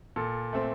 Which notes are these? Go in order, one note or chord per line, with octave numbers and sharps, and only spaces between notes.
A#2 A4
A3 C4